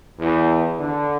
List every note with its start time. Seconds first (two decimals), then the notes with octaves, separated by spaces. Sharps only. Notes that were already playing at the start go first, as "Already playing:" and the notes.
0.17 E2
0.77 D3